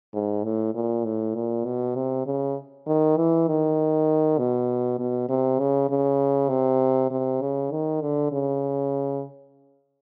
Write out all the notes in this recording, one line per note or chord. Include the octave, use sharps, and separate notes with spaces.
G#2
A2
A#2
A2
A#2
B2
C3
C#3
D#3
E3
D#3
B2
B2
C3
C#3
C#3
C3
C3
C#3
D#3
D3
C#3